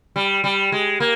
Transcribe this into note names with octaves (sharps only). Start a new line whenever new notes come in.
G3
G3
G#3
A#3